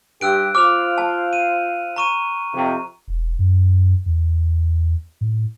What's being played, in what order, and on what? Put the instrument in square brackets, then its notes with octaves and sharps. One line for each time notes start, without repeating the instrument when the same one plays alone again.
[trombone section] G2 G4 [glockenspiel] E6 F#6 D7
[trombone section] F4 C5 [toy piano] D6 [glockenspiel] F6 F7
[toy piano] A5
[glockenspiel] D#7
A#5 C#6 D#7
[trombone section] F2 C3
[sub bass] E1
F#2
E2
A2